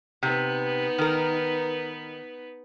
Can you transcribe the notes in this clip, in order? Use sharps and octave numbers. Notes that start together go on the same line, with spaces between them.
C3 B3 D#4 B4
D#3 A#4